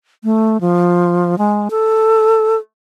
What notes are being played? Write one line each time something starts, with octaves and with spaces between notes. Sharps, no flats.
A3
F3
G#3
A4